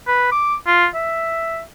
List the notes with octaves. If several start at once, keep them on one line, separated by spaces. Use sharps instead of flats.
B4
D6
F4
E5